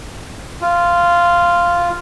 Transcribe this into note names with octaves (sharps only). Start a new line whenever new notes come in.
F4